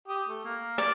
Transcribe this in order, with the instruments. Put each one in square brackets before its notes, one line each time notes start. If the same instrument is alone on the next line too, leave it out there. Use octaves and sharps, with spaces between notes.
[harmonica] G4 D#6
A3
A#3
[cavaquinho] D5